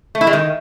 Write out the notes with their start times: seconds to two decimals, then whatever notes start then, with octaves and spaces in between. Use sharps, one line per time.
0.15 A3
0.21 E4
0.27 G#3
0.33 D#3